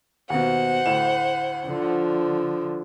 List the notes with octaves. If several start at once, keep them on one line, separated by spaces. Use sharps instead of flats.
D#2 B2 C5 F#5
D2 A2 E7
D3 F3